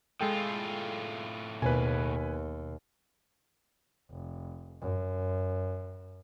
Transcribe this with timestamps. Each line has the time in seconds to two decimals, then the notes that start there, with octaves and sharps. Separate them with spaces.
0.21 A2 G#3 F4 A4 G5
1.62 D#2 B2 B4 G#5
4.11 F1
4.81 F#2